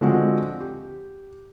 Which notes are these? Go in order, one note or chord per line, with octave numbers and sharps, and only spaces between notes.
D3 F3 G#3 C4 F#4
G4